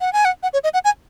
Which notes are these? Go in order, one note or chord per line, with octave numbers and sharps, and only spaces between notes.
F#5
G#5
F#5
F#5
C#5
D#5
F#5
G#5